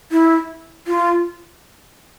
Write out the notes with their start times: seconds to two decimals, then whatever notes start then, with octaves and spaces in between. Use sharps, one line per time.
0.12 E4
0.87 F4